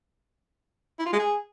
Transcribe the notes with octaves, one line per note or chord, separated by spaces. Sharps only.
E4
F4
G#3
G#4